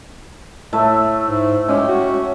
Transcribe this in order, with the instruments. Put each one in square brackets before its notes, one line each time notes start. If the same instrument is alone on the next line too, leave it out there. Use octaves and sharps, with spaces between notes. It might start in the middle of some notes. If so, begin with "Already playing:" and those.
[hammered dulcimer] A2 A3 E5
[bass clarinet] G#2
[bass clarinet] G#3 [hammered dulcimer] C#4 G4 G5
[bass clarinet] F#4